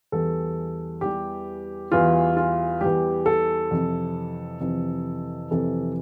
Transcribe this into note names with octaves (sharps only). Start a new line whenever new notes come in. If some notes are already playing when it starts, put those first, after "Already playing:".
E2 E3 G3 A4
E2 E3 G3 G4
E2 E3 G3 F4
F4
E2 E3 G3 G4
A4
F2 C3 E3
F2 C3 E3
F2 C3 E3 A4